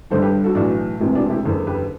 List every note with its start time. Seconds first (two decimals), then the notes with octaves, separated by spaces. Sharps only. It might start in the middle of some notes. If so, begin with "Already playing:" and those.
0.10 G1 G2 D3 A4 C5
0.22 G4 B4
0.44 F#4 A4
0.55 B1 A2 E3 D4 F#4
1.00 E1 D2 C3 E3
1.15 D4 F#4
1.30 E4 G4
1.45 F#1 E2 D3
1.67 G4 B4